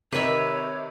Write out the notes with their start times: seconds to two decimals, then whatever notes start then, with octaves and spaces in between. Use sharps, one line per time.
0.12 C3 D#3 G4 A#4 B4 C#5 D#5 E5